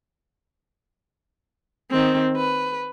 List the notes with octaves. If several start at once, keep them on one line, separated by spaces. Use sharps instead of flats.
D#3 C4
B4